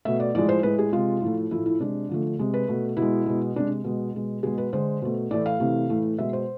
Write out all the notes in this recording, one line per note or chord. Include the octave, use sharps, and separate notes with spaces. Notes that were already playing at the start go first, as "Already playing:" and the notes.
B2 A3 E5
D5
A2 F3 G#3 D5
C5
A2 G#3 B4
G#4
C3 G#3 F4
A2 F3 A3
A2 F3 A3 E4
E4
C3 G#3 D4
D3 F3 A3
C3 G#3
B4
B2 A3
B2 E4
G#3
B2 G#3
C3 G#3 D4
B2 G#3
B2 G#3
B2 G#3 G#4
B4
D3 G#3 C5
B2 A3
A2 E3 A3 D5
F5
C3 E3 A3
A2 E3 A3
B2 G#3 E5
C5